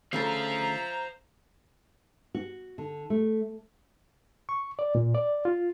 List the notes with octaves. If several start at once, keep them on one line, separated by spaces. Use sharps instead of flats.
D2 C#3 A4 C5 E5 F5 A#5
F#4
D3
A3
C#6
D5
A#2
D5
F4